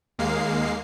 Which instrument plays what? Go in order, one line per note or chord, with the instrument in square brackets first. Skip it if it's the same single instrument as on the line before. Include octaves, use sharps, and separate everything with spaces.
[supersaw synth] D#2 G#3 A#3 F5 C7